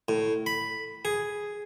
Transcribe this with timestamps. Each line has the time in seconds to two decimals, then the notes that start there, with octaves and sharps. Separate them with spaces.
0.09 A2
0.46 B5
1.05 G#4